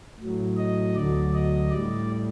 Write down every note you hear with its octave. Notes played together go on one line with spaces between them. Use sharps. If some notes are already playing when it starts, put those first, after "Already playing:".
A2 F#3
D#5
D2 D3 F#3 D5
D#5
A2 G3 D5